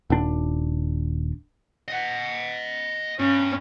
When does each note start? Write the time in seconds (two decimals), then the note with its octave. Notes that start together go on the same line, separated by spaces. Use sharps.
0.10 D#1 D4
1.88 D#5 F#5
3.20 G2 C#4